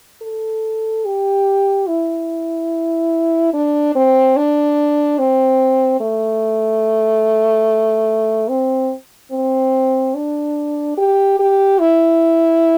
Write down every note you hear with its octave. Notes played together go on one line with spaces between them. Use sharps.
A4
G4
E4
D4
C4
D4
C4
A3
C4
C4
D4
G4
G4
E4